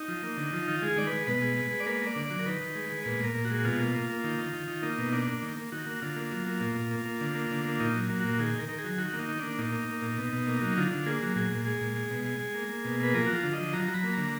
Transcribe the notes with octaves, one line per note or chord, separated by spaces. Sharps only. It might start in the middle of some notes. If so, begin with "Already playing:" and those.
Already playing: D#4
F3
A#3
D3
F3
D#3 F4
G#3
G#4
D#3 D5
G#3 B4
B2 B4
G#3
G#3
G#3
D5
A#3 B4
A#3 D5
D3
F#3 D5
A#4
D#3 B4
D#3
G#3
G#3
A#2 B4
A#2 A#4
A#2
F#4
G#3
B2 F4
A#3
A#3
A#3
D#3
D#3
D#3
D#3
A#3 D#4
B2
A#3 D4
A#3
D#3
A#3
D#3 F#4
A#3
D3 F4
A#3
F#3
A#3
A#2
A#2
A#3
A#3
D3
A#3
D3
A#3
A#2 D#4
F#3
A#3
A#2 F#4
D#3 G#4
D#3 A#4
D#3 A#4
G#4
F#3
D#3 F#4
A#3
D#4
D#3
A#3 D4
A#2 D#4
A#3
A#3
A#2
B2
B2
A#3
F#3
D3 F4
D3
A#3 G#4
F#3
A#2 G#4
A#2
G#3 G#4
A#2
G#3
B2
G#3
G#3
A#3
A#3
B2
A#3 B4
F3 A#4
F#4
F3
F4
D3
F3 D#5
F#3 A#5
F#3
B5
A#3
D3 A#5